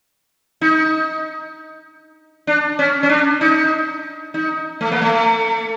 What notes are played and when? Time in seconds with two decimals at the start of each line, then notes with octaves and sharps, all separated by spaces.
0.61 D#4
2.47 D4
2.79 C#4
3.03 C#4
3.09 D4
3.41 D#4
4.34 D#4
4.81 A3
4.91 A#3
5.02 A3